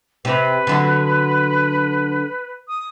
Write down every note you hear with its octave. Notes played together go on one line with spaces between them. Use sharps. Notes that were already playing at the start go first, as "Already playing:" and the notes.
C3 B4
D3 F#3
D#6